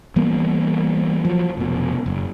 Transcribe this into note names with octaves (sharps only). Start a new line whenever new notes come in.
E3 G3 A#3 B3
F3 F#3
F1 B2
F#1